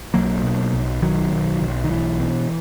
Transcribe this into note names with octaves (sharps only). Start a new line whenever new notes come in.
B1 F#3 A#3
B2
B1
B1 D#3 F#3
B1
B1
D#3
B1 E3
B2